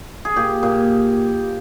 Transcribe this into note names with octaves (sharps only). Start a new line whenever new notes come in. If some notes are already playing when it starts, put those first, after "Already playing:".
G#4
A#2 G4
A#2